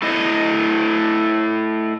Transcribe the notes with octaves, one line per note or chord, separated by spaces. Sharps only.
A3 E4 D#5